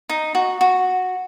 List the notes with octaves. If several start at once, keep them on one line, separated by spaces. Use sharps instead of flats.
D#4
F#4
F#4